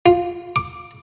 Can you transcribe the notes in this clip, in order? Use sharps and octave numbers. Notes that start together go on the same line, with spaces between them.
F4
D6